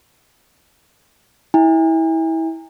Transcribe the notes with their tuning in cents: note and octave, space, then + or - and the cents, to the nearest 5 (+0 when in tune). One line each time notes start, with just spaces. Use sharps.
E4 -25 G#5 -45